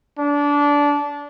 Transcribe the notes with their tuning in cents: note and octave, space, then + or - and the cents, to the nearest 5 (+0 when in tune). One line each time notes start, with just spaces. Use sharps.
D4 -20